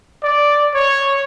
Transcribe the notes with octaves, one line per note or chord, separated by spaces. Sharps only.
D5
C#5